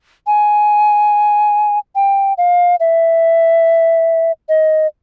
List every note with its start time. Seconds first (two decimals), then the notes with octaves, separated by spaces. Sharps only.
0.27 G#5
1.95 G5
2.38 F5
2.80 E5
4.49 D#5